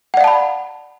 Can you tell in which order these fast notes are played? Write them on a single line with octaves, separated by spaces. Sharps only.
F#5 D5 F5 A5 B5